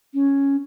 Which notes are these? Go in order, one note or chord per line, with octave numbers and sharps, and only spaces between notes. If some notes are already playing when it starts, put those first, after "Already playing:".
C#4